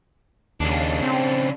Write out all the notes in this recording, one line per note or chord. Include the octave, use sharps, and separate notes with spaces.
D#2 C#3 D4
C4